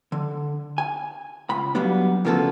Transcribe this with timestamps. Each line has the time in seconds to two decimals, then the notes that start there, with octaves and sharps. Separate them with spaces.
0.12 D3
0.78 G#5
1.49 C#2 B5
1.75 F#3 G3 A#3 B3 D4
2.25 D2 C#3 F3 A#3 B3 A4